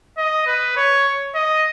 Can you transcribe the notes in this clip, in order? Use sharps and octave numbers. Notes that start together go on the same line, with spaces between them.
D#5
B4
C#5
D#5